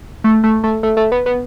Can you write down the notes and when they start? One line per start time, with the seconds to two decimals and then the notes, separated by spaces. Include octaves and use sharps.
0.24 A3
0.44 A3
0.64 A3
0.83 A3
0.97 A3
1.12 B3
1.26 B3